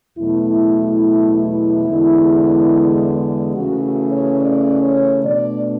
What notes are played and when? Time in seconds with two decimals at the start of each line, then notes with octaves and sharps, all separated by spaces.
0.17 E2 B2 F#3 A3 E4
1.86 E2 D3 G#3
3.55 C#3 E3 A3 C#4 F#4
3.83 F#4
4.12 C#5
4.40 D5
4.82 C#5
5.24 B2 A3 D4 D5